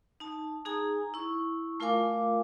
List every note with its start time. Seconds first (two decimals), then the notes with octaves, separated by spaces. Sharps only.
0.20 D#4 A5
0.65 D#4 G#4 G#5 A#5
1.14 E4 C#6
1.80 A3 F4 A#4 F5 G#5 D6